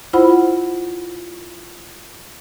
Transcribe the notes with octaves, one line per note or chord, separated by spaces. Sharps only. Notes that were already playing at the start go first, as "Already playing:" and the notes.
E4 F4 C5 F#5 B5